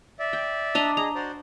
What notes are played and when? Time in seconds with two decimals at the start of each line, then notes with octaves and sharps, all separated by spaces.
0.19 D5 E5
0.33 G5
0.75 D4 D#5 A#5
0.97 G#4 D#5 A#5
1.15 F#4 C5 D5